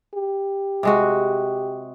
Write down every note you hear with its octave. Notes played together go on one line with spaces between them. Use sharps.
G4
C3 G#3 F#4